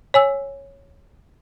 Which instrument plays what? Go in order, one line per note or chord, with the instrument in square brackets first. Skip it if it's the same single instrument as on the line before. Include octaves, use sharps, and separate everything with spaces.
[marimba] C#5 G#5 E6